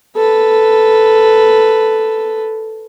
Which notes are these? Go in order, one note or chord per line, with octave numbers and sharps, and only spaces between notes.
A4 B4